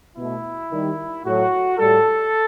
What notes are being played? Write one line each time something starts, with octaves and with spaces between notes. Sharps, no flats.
B2 A3 E4
D#3 G3
A2 F#3 A3 F#4
A2 G3 A4